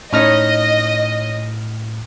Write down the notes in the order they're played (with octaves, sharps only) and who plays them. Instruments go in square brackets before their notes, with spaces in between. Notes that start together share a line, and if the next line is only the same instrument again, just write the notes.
[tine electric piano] A2 F6 A#6 [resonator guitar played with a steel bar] C#4 D#4 C#5 [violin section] D#5